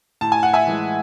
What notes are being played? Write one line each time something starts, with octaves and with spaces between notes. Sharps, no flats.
A2 A5
G#5
F#5
E5 G#5
E3 G#3